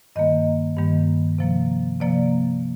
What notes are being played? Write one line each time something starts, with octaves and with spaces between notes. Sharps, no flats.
G2 D#3 G3 A#3 D#5
G2 D#3 G3 A#3
C3 F3 A#3
C3 F3 A#3 D5